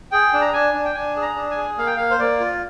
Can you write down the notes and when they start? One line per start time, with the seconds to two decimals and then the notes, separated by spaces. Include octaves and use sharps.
0.12 G#4 G5
0.34 D4
0.41 A#5
0.53 D4 G#5
0.74 D4
0.85 G5
0.95 D4 G#5
1.16 G#4
1.22 A#5
1.36 D4
1.51 G#5
1.57 G#4
1.78 A#3 F5
1.87 G5
1.97 A#3 F5
2.11 C5
2.19 A#3 D5
2.40 F4